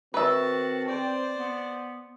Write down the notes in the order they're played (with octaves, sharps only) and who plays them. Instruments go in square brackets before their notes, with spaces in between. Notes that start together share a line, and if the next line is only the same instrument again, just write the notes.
[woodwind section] D#3 F#4 [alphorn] C4 [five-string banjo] B4 E5 [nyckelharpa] A5
[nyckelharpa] C5 D5 [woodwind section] G5
[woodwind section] B3